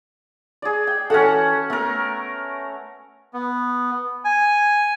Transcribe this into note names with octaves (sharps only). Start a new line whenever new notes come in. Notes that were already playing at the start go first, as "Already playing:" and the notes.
G#4 D5
G5
E3 C#4 F#4 A4 F#5
A3 B3 A#4
B3
G#5